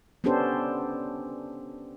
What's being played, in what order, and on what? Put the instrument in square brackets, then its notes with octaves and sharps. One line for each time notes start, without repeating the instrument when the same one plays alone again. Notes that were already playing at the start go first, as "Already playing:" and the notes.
[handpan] B3 C#4 D4 G4 A4 C5